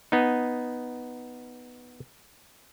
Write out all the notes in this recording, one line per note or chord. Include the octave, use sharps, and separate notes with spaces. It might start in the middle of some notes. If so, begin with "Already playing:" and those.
B3 D#4